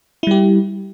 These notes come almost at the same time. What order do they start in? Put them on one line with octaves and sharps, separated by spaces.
E4 G3 G4